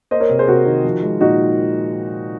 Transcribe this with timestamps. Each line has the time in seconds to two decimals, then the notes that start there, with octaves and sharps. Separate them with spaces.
0.11 A#3 C5 D#5
0.20 A#4 C#5
0.29 C3
0.39 G#4 C5
0.47 C3 F#4 A#4
0.65 D#3
0.84 F3
1.02 G#3
1.21 A#2 D#4 F#4